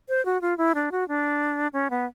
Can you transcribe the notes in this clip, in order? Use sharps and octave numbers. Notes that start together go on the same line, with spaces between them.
C5
F#4
F4
E4
D4
F#4
D4
C#4
B3